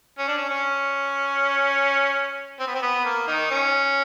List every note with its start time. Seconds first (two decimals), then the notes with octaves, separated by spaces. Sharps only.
0.18 C#4
0.28 D4
0.37 C#4
0.49 C#4
2.59 C4
2.67 B3
2.74 C4
2.82 B3
3.05 A#3
3.27 D#3 D#4
3.50 C#4